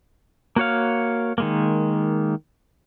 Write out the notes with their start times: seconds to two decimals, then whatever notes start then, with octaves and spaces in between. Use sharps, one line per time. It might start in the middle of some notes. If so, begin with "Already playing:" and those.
0.56 A#3 F#4 C#5 F5
1.38 D#3 G#3 A#3